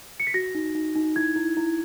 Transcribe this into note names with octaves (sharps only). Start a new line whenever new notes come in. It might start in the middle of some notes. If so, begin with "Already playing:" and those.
C#7
B6
F#4 A#6
D#4
D#4
D#4
E4 G#6
E4
E4